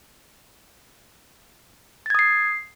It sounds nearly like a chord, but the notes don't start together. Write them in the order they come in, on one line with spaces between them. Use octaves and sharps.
A6 G#6 D#6 C7